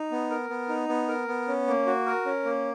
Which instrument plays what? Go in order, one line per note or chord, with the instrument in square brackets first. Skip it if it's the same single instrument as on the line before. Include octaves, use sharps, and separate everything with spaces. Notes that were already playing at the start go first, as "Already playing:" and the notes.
Already playing: [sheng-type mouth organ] D#4
B3
A#4
B3
D#4
B3
A#4
B3
C#4
A#3
F#4
A#4
C#4
A#3